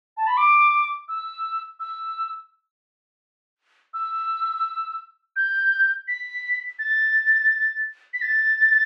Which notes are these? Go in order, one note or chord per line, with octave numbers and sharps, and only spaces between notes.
A5
B5
D6
E6
E6
E6
G6
B6
A6
B6
A6